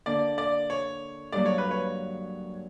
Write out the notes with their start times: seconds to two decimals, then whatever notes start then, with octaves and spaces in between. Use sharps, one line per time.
0.06 D3 A#3 D4 D5
0.38 D5
0.70 C#5
1.32 G2 F#3 A#3 D5
1.45 C#5
1.58 B4
1.71 C#5